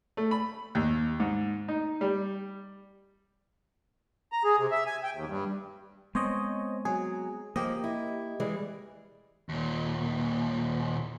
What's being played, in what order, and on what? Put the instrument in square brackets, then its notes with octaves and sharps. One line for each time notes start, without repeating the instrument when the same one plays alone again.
[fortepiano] A3
B5
D#2
G#2
D#4
G3
[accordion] A#5
G#4
C3
E5
G#5
G5
D#2
G2
[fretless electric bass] G#3 B3 C4 [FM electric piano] C5 C#5 D#5
[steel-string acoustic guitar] F#3 [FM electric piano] G#4
[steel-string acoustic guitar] F3 [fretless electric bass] A#3 [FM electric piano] G4 D#5
[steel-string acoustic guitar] E4
E3 G3 G#3
[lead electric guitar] D#2 A#2